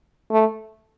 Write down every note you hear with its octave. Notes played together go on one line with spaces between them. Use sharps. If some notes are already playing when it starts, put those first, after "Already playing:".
A3